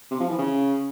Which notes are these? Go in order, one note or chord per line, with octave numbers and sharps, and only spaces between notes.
C3
F3
E3
C#3